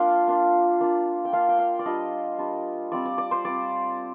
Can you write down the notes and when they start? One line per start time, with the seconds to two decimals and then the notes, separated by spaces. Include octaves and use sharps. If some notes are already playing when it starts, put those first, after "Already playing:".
Already playing: A#3 D4 F4 F5 G5
0.27 A#3 D4 F4
0.80 A#3 D4 F4
1.25 G5
1.33 A#3 D4 F4 F5
1.49 G5
1.59 F5
1.79 D5
1.86 G3 D4 F4 D#5
2.38 G3 D4 F4
2.92 G3 C4 F4 D5
3.06 D5
3.18 D5
3.31 C5
3.45 G3 C4 F4 D5